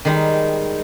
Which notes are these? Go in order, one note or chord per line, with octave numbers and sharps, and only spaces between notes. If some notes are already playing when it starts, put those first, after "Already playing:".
D#3 G3 G#3 D#4